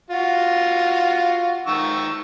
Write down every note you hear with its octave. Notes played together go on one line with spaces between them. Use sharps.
F4 F#4
D#3 C#6 E6